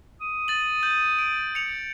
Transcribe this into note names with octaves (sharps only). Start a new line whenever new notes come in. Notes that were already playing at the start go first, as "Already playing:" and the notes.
D#6
A6 F#7
G6 F#7
D7
C#7 F7